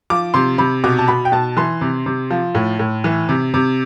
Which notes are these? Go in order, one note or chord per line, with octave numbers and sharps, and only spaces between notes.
F3 D6
C3 C6
C3 B5
B2 D6
A5
B2 B5
G5
B2 A5
E3 C6
C3
C3
F3
A2
A2
E3
C3
C3